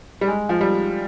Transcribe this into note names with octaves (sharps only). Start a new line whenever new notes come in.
G3
G#3
F3
G3